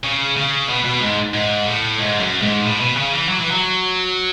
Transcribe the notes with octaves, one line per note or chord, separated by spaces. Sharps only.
C#3
C#3
B2
B2
G#2
G#2
A2
G#2
F#2
G#2
A2
B2
C#3
E3
F#3
E3
F#3